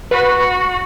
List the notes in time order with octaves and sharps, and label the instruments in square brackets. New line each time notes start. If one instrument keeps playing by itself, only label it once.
[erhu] F#4 [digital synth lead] B4